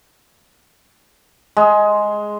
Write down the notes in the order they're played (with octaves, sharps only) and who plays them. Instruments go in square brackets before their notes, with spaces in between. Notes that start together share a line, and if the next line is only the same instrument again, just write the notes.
[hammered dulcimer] G#3